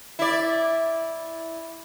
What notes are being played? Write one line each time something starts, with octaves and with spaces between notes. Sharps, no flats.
E4 D5